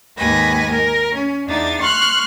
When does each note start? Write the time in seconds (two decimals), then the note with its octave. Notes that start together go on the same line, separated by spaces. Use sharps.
0.18 D#2 G#2 B4 G#5 A#6
0.69 A#4
1.13 C#4
1.47 E2 D4 D#4 A6
1.80 C6 C#6 F6 F#6